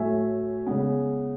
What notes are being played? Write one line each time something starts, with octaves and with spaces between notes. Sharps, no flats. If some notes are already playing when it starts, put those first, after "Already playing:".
Already playing: A2 F#3 A3 E5 G#5
C#3 G#3 B3